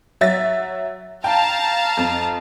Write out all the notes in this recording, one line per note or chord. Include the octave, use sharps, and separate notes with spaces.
F#3 E5 A6
F5 G5 A5 A#5
F2